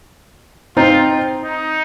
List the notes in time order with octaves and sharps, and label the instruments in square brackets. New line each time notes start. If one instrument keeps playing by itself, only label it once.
[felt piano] C4 D#4 [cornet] F4
[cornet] D#4